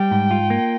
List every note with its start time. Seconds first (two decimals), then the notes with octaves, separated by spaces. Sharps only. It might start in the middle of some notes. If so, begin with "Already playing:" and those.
Already playing: G3 G5
0.11 G#2
0.31 F4
0.50 A#3